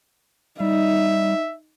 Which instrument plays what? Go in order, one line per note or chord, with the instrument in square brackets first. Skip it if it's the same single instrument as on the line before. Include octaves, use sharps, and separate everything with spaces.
[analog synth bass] G3 [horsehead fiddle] D#4 [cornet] E5